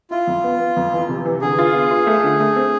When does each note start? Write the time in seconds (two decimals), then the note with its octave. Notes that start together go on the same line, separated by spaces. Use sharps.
0.11 E4 F4
0.27 F2
0.44 B3
0.60 B3
0.77 F2
0.93 E3
1.09 C3
1.25 E3
1.42 D3 G#4
1.58 F4
1.74 B3
1.91 F4
2.07 A3
2.24 D3
2.40 A3
2.56 C4